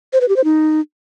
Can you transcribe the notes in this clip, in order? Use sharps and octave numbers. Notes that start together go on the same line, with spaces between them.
C5
B4
G4
C5
D#4